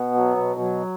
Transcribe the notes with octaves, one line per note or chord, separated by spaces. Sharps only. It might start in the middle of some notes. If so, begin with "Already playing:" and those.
Already playing: B2 B3
F#3
B2
F#3